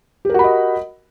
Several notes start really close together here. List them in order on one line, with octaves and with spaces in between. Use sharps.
G4 A#4 F#4 B5 D#5